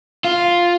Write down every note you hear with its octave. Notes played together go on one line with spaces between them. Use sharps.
F4